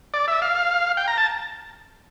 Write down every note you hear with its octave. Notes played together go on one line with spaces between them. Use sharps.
D5
E5
F5
G5
A#5
A5